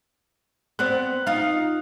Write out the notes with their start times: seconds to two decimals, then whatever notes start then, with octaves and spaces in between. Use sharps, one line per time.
0.79 B3 C4 D5 F#6
1.27 D#4 F4 F5